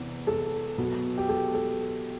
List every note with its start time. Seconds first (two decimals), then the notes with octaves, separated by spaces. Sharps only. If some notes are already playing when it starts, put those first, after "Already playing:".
Already playing: E2 C3 E3 B3
0.27 A4
0.78 B2 F#3 B3
1.18 G4
1.29 A4
1.54 A4